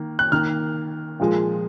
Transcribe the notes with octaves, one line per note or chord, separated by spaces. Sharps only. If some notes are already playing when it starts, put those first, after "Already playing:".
Already playing: D#3 A#3
F#6
D#3 A#3 F6
A#2 F3 G#3